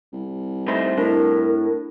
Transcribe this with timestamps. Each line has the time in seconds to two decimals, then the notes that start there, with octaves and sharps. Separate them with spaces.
0.13 C2
0.68 A3 D#4 C5
0.98 A2 D4 A#4